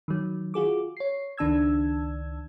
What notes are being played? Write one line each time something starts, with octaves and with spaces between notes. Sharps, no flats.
D#3 F#3
F4 F#4 G#4 D6
C#5 C7
C#2 D#3 D4 A5 E6 G#6